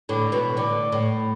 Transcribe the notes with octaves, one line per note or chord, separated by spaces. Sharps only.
A2 D3
B2 E3
A2 D3
A2